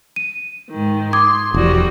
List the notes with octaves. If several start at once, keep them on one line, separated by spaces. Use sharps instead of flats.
D#7
G#2 D#3
C6 D6 D#6 G#6
E1 F3 G3 F#4